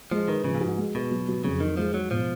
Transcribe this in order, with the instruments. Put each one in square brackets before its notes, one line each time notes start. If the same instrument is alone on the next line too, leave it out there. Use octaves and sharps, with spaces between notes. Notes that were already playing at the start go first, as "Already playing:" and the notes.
[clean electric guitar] F3 [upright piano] G#3
[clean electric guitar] D#3 [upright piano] B4
[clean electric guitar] C#3 [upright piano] F3
[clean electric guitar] A#2
[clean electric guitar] G#2 [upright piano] F#4
[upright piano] G#3
[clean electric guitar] B2 [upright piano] B4
[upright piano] F#3
F#3
[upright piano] F2 [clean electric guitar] C#3
[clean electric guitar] D#3 [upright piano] D#4
[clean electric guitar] F3 [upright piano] G#3
[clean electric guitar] F#3 [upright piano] G#3
[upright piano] B2 [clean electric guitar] F3